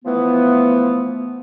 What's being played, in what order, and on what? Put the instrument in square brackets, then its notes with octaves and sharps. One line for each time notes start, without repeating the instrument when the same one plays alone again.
[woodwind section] E3 F3 A3 B3